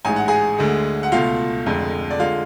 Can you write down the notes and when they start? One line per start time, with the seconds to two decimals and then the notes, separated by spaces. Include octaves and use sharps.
0.05 A1 G#2 G#3 G#5
0.16 F#5
0.28 G#4 G#5
0.58 D2 D3 G#3
1.03 F#5
1.12 C#2 B2 A3 F4 F5
1.66 F1 F2 D3 G#3
2.11 D5
2.19 D3 G#3 F4 F5